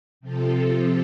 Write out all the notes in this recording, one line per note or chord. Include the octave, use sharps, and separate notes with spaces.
C3 F3 C4 F4 A4